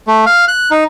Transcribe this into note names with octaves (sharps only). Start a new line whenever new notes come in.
A3
F5
F#6
D#4